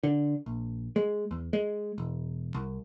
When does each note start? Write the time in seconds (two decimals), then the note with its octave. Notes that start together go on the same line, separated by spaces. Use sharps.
0.03 D3
0.46 A#1
0.96 G#3
1.31 E2
1.53 G#3
1.98 E1
2.55 C2